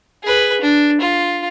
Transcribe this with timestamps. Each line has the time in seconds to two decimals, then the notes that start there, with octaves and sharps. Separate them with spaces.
0.24 G#4 B4
0.61 D4
1.01 F4